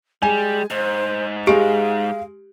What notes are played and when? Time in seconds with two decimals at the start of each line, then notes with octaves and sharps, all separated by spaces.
0.22 G3 G#3 G#5
0.71 G#2 C5
1.47 G#3 G4 F5 D7